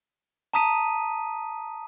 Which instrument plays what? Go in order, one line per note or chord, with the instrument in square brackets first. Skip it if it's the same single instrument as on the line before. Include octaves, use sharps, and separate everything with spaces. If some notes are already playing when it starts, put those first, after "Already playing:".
[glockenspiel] A5 A#5 D#6 B6 D#7